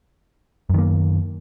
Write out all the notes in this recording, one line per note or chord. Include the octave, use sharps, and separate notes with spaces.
F#2 D#3 A#3